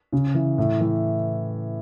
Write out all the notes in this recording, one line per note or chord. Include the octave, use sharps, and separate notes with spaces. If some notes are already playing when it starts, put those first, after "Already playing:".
C#3
E3
A2
E3